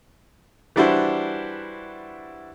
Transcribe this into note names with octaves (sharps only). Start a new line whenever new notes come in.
E3 G3 D4 E4 F#4 C5